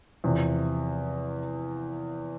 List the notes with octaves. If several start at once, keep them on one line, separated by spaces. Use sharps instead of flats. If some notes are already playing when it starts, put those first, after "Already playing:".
E2 C3 F3